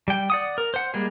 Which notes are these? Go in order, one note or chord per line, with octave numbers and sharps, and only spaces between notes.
G3 G5
D5 F#5 D#6
A#4
C5 F#5
G3 G#3 A#3 G#4